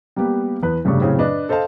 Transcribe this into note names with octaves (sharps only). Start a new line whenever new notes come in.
G3 A#3 B3 G4
E2 B4
F1 G2 C#3 A3 D4 C#6
F#2 A2 C#3 C4 C#4
D4 B4 D#5
A4 C5 D#5 F5 A5